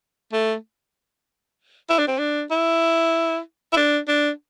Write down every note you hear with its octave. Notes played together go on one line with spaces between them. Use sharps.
A3
E4
D4
C4
D4
E4
E4
D4
D4